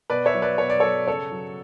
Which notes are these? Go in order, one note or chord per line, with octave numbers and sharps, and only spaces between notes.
B2 B4 D5
C#5 E5
F#3
B4 D5
B2 C#5
D5
F#3 A4 C#5
C#3 A4 C#5
F#3